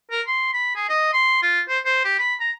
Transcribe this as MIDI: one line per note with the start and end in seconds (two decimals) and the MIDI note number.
0.11 0.22 70
0.27 0.49 84
0.53 0.71 83
0.75 0.85 68
0.89 1.09 75
1.13 1.41 84
1.42 1.61 65
1.68 1.79 72
1.85 2.00 72
2.04 2.16 67
2.19 2.35 83
2.40 2.51 82